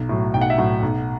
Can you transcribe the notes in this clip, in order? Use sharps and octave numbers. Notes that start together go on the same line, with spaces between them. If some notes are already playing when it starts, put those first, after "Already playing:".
Already playing: B1
A2 F#3
B1 G5
F#5
E5
A2 F#3 F#5
B1